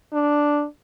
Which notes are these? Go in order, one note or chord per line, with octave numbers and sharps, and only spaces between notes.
D4